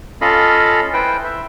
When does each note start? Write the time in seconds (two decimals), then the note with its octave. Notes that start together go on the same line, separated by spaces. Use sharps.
0.21 C#4 F4 A4 D#5 F5 B5
0.93 E4 B4 C5 G5
1.24 E5